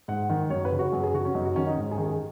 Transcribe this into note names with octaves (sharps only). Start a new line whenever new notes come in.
G#2 F#5
D#3
F#2 C#5
B4
C#3
F#4
F#2 G#4
G#4
C#3 F#4
C#4
F#2 D#4
F#4
D#3 C#4
D#4
G#2
G#4
D#3
G#4